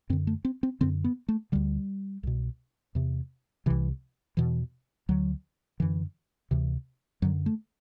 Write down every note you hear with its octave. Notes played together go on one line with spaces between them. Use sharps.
F#2 D3 C4
A3
C4
C4
F#2 D3 C4
B3
A3
D2 D3 G3
C2 B2
E2 C3
C2 C3 E3
E2 B2 E3
D2 D3 F#3
F#2 D3 E3
D2 C3 E3
F#2 D3 F#3
A3